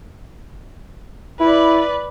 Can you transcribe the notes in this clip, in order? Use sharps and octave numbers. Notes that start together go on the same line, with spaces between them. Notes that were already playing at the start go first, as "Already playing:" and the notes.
E4 B4 D5